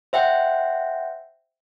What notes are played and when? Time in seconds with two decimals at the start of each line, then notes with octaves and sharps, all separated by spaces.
0.13 C5 E5 F#5 G5